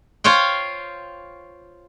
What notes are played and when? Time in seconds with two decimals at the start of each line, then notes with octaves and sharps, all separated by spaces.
0.24 F4 C5 C#5 F5 G5